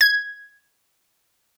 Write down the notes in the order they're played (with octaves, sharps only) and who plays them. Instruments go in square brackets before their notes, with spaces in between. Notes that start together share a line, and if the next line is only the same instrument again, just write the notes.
[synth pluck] G#6